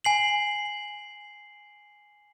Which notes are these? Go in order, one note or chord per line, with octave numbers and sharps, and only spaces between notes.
G#5 C7 F#7